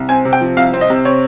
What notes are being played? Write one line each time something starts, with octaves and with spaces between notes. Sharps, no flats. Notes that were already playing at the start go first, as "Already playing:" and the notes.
Already playing: C2
C4 G#5
C3
G5
F3
C2 F5
C4
D#5
C3
C4 C#5